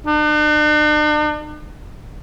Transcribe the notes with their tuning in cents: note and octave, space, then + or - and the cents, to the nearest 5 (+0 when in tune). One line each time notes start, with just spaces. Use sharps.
D4 +45